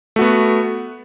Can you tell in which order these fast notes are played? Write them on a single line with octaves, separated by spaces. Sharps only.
A3 F#4 B3